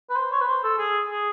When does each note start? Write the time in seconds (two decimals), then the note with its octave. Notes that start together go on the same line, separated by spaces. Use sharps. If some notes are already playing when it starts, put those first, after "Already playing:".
0.10 B4
0.16 C5
0.32 C#5
0.41 B4
0.48 C5
0.64 A4
0.78 G#4
1.10 G#4